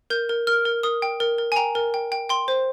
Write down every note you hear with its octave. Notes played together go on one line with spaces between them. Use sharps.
A#4 G6
A#4
A#4 F6
A#4
A#4 D#6
G5
A#4
A#4
G#5
G5 A#5
A#4
G5
G5
G5 C6
C5